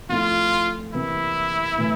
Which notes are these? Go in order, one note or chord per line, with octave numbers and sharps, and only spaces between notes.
F3 A3 C4 E4 F4
C3 E3 A#3 E4
A2 E3